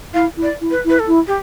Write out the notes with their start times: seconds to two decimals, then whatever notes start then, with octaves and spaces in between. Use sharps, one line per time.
0.14 E4 F5
0.37 E4
0.42 D5
0.61 E4
0.71 B4
0.85 E4 B4
0.99 A4
1.08 E4
1.27 G4